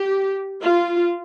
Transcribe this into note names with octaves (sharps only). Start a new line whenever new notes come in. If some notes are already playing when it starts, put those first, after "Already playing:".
Already playing: G4
F4